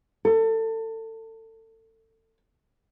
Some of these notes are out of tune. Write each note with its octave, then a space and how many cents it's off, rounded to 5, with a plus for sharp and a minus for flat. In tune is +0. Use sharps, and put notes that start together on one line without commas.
A4 +30